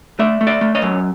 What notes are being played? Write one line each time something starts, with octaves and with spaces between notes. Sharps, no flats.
A3 D5 E5
A3
D5 E5
A3
C#5 D#5
F#2